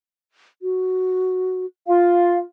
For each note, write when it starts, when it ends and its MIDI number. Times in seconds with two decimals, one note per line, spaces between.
0.62 1.66 66
1.87 2.42 65
1.87 2.39 77